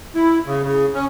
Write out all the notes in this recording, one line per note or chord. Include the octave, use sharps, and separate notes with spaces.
E4
C#3
C#3
C#4